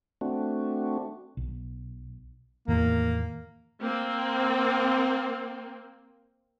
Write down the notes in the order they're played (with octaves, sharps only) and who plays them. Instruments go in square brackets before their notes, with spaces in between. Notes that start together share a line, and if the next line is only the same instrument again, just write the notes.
[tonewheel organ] A3 C4 D4 F#4
[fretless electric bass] B1
[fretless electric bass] E2 A2 D#3 [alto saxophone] A#3
[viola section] A#3 C4